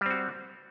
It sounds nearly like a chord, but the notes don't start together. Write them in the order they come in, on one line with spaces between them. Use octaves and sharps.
G3 C4 F#4